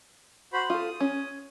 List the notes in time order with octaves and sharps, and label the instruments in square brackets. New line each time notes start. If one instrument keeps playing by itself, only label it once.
[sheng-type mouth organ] F#4 C5 B5
[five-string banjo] F4 A4 [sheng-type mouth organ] D#6
[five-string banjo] C#4